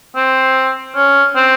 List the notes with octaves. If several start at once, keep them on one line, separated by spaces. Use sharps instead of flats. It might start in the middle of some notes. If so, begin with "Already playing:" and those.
C4
C#4
C4